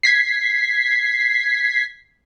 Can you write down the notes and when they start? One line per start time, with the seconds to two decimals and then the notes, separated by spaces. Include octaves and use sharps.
0.03 G#6 B6 C7